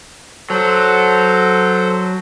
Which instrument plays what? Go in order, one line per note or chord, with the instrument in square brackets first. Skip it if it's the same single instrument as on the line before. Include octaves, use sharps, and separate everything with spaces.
[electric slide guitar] F#3 [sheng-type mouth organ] A4 C5